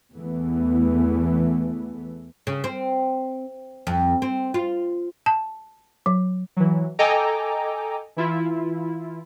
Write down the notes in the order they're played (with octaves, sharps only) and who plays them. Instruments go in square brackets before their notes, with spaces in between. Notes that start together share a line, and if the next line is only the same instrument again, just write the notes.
[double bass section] E2 E3 A3 B3
[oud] C#3
C4
F2
C4
F4
[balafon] A5
F#3
[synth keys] E3 F#3
A4 D#5 G5 G#5 A#5 D6
E3 E4 F4